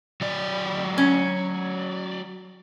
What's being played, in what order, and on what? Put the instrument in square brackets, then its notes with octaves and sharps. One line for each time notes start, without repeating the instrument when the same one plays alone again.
[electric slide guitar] F#3 D5
[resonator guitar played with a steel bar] C#4